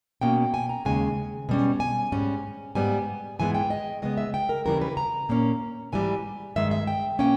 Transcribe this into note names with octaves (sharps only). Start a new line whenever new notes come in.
B2 A#3 C#4 G5
G#5
A#5
D#2 C#3 G#3 G#5
B2 G3 C#4
G#5
G#2 G3 C#4
G#2 G3 B3 G#5
G#2 E3 G#3 B3 G#5
G5
D#5
C#3 G#3 B3 D#5
E5
G5
A#4
D#2 C#3 E3 G3 A#4
B4
A#5
A#2 A#3 C#4
G#2 E3 G3 G#5
G2 D#3 G#3 E5
E5
G5
B2 A#3 C#4 G5